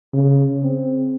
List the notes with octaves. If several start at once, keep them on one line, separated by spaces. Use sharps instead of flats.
C#3
C4